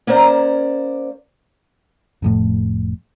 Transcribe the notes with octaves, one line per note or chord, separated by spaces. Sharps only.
A#3 C#4 C5 D5 A#5
F1 F2 A2